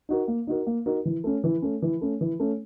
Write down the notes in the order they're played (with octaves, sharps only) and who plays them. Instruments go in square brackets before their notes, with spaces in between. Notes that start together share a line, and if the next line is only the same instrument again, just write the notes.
[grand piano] D#4 F#4 A#4
A#3
D#4 F#4 A#4
A#3
D#4 F#4 A#4
E3
A3 C#4
E3
A3 C#4
E3
A3 C#4
E3
A3 C#4